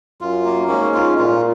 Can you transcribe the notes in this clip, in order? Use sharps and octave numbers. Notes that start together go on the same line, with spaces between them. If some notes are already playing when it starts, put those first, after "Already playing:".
F#2 F4
A#3
G#2 C#4
F4
A#2 F4